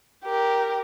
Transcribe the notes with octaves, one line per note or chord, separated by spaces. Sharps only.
G4 A#4